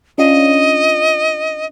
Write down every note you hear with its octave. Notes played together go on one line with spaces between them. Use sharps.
C#4 D4 F4 D#5